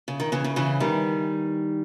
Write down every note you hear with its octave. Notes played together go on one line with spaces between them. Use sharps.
C#3
D#3
C#3 E3
C#3
C#3 E3
D#3 G3